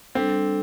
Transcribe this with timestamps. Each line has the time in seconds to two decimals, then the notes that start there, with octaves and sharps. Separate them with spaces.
0.15 G3 C4 D4 A4